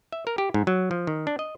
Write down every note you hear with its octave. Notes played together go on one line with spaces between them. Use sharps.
E5
A#4
G4
G#2
F#3
F3
D#3
D4
D#5